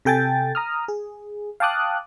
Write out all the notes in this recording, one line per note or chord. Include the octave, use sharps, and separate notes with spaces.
C3 A4 G5 G#5 A6
A#5 D#6 F6
G#4
F5 G5 A5 D6 D#6 F#6